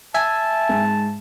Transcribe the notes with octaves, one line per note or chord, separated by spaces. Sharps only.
E5 G#5 A5
G#2